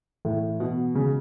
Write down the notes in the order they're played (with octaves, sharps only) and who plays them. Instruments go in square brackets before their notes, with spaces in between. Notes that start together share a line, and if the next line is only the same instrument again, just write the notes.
[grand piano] A2 [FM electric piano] E3
[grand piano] B2 [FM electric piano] F#4
[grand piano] C#3 [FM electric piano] G#3